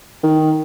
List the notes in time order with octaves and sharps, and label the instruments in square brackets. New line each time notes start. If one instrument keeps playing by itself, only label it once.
[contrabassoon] D#3